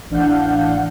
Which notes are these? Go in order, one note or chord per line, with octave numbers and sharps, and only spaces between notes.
A1 E3 D4 F5 F#5 G6